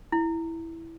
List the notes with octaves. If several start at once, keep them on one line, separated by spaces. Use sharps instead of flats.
E4